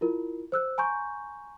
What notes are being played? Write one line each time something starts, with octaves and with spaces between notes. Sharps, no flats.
E4 F4 A#4
C5 E6 F#6
G#5 A#5 C6 C#6 G6